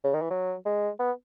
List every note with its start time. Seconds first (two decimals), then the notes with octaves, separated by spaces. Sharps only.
0.04 C#3
0.14 D#3
0.22 E3
0.31 F#3
0.66 G#3
1.00 B3